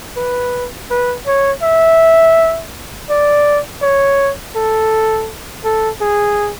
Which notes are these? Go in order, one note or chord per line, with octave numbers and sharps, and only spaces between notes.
B4
B4
C#5
E5
D5
C#5
A4
A4
G#4